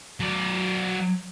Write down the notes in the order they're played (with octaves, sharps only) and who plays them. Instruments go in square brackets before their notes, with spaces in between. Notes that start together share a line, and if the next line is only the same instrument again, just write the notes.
[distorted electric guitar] F#3 D5